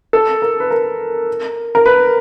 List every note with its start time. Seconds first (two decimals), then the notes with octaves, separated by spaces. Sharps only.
0.13 A4
0.42 A#4
0.60 B4
0.70 A#4
1.75 A#4
1.86 B4